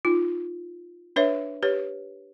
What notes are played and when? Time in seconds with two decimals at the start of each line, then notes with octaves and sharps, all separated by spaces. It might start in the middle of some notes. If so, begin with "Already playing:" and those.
0.05 D#4 F4
1.16 D4 B4 C#5 E5
1.63 G4 B4 C#5